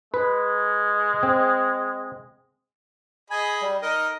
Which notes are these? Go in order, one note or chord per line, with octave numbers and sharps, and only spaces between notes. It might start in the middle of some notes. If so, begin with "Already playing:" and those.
G#3 B4
C4
G#4 D#5 G#5 B5
G3
D#4 A#4 D#5